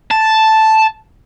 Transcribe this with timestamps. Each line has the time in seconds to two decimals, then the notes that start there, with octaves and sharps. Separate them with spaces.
0.11 A5